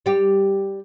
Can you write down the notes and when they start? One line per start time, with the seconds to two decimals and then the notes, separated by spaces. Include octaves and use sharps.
0.06 G3 G4